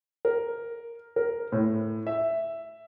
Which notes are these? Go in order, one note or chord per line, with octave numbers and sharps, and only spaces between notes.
A#4
A#4
A2
E5